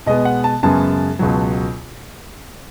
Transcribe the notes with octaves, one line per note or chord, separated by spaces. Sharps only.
B2 G#3 B3 D#5
F#5
A5
F#2 C#3 G#3 B3 A5
C#2 B2 F#3